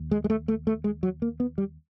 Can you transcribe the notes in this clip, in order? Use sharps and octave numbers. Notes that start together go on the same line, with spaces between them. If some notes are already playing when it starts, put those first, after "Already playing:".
Already playing: D#2
G#3
G#3
A3
A3
A3
G#3
F#3
A#3
B3
G3